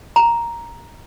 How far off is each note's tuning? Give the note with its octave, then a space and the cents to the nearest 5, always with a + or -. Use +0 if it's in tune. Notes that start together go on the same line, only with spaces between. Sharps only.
A#5 +5